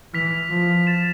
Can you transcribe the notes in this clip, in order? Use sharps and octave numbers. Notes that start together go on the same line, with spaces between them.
E3 F6 B6 F7
F3
A6 E7